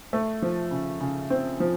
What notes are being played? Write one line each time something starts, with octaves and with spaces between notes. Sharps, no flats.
A3
F3
C#3
C#3
C4
F3